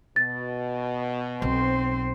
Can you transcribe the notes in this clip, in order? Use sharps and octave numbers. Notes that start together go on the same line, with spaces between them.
B2 A6
B1 C4 C5